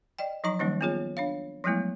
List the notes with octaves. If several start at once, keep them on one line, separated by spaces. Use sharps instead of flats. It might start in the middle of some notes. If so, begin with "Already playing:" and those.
D5 D#5 G5
F3 F#3 D#4 D#5 A#5 C#6
D#3 F3 G3 A#3 C#4 D#4
B3 C#4 F4 G#4 C#5
D4 C#5 F5
F3 F#3 G#3 A3 B3 E4